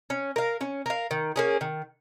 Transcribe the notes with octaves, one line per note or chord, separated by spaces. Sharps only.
C#4
A#4 F5
C#4
A#4 F5
D#3
A#3 C#4 G#4
D#3